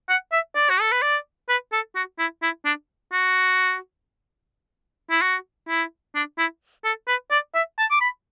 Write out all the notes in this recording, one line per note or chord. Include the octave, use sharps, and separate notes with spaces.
F#5
E5
D5
F#4
A4
B4
D5
B4
A4
F#4
E4
E4
D4
F#4
E4
F#4
E4
D4
E4
A4
B4
D5
E5
A5
D6
B5